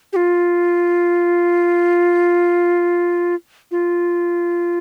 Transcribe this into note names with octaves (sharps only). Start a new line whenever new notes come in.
G4
F4
F4